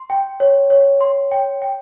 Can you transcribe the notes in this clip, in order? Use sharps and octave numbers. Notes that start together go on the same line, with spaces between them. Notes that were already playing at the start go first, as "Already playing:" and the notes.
Already playing: C6
G5
C#5
C#5
C6
G5
G5